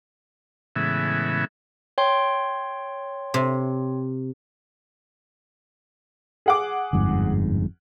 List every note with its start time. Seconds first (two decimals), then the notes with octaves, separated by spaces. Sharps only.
0.76 A2 C#3 E3 G#3 B3 E5
1.98 C#5 G5 C6
3.34 C3
6.46 G#4 F#5 D6
6.93 G1 F2 G#2